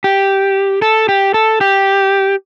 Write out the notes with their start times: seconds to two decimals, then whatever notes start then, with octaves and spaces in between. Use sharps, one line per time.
0.04 G4
0.82 A4
1.09 G4
1.34 A4
1.61 G4